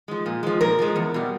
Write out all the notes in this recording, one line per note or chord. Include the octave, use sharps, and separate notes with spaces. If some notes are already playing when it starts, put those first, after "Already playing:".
F3 G#3
A#2
F3 G#3
A#2 A#4
F3 G#3
E2
B2 G3